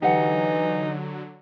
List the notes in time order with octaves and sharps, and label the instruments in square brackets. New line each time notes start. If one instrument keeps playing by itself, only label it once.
[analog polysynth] D3 F#3 [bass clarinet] E3 [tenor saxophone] D#4 [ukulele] G4 F#5